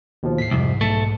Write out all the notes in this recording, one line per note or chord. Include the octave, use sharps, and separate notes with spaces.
D#2 B2 F3
A2 B6 C7
C2 F2 G#2
B1 A3 A5 C#7